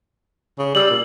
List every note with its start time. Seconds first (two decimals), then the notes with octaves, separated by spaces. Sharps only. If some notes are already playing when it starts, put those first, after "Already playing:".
0.59 C#3
0.75 G3 E6 F#7
0.90 A#2